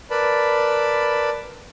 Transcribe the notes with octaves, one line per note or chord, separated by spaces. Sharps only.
A#4 B4 D5 A5 B5